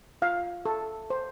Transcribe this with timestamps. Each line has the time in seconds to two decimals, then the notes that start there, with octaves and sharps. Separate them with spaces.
0.22 F4 F5
0.65 A4
1.10 C5